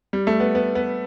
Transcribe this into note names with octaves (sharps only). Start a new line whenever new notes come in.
G3
A3
B3
B3
B3